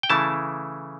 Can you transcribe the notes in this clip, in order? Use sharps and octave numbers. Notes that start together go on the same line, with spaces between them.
G5
C#3 E3 A3 E4 A5